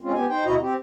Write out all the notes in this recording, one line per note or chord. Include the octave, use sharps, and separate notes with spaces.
G#3 C4 C#4 F4
B3 G4 G#5
D#4 C5 G5
D2 B2 E4 F#4 D#5 A#5
C4 G4